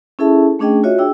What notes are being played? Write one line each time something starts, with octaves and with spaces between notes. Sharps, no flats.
C#4 E4 G#4 A4 E5 A5
A3 C#4 D4 G#4 D#5 G5
F4 F#4 C#5 D#5 E5
D4 G#4 G5 E6